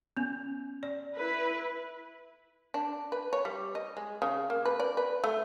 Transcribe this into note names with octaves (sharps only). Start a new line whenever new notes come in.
B3 C#4
D5
E4 B4
D4
B4
C#5
G3
D#5
G#3
C#3
A#3
B4
D5
B4
A3